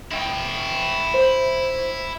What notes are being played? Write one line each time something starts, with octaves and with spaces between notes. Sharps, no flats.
E4 G5
C5